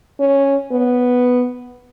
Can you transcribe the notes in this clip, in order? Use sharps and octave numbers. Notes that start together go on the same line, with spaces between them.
C#4
B3